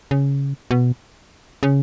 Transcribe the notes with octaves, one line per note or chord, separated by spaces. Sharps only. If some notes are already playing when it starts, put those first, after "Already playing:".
C#3
B2
C#3